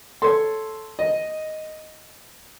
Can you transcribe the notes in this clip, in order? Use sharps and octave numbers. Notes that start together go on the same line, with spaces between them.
A4 C#5 C6
D#5